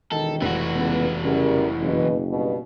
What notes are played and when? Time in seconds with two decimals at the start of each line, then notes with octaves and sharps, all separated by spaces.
0.12 E1 D#3 A4
0.42 F1 E3 F#4
0.76 C#2 B3
1.25 F#2 C#3 G3 A#4
1.81 F#1 B2
2.30 G2 B2